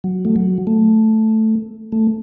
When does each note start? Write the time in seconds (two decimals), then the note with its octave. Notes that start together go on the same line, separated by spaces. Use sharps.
0.04 F#3
0.25 A3
0.36 F#3
0.67 A3
1.92 A3